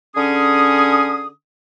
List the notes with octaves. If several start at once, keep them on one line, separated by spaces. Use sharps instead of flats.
D3 C#4 G#4 D#6